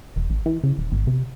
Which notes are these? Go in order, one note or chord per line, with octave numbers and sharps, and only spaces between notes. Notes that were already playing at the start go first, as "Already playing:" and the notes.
E1
A1
E3
C#3
D#1
G#1
C3